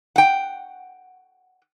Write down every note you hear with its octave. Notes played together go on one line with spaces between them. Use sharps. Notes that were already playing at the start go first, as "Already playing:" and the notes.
F#5 G5